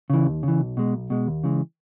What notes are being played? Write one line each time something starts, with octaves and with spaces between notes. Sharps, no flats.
C#3 E3
D#2
C#3
E3
B1
B2 G#3
B1
B2 G#3
D#2
C#3 E3 G#3